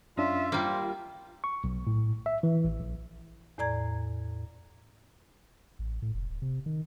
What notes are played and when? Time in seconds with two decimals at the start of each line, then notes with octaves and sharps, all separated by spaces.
0.17 F#2 C#4 D4 F4 E5
0.52 G3 A#3 F4 C5
1.44 C#6
1.64 B1
1.87 A2
2.26 E5
2.43 E3
2.65 A1
2.80 A#1
3.58 E2 A2 D5 A#5 G#6
5.79 A1
6.02 A2
6.14 F1
6.30 D#1
6.42 C3
6.66 D#3